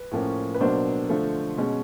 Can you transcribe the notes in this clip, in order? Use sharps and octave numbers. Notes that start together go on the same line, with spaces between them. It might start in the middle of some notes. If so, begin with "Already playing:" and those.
Already playing: B4
A2 F3 A#3 C#4
B4
B2 F#3 A#3 D4 C5
D3 F3 A3
B2 G#3 C#4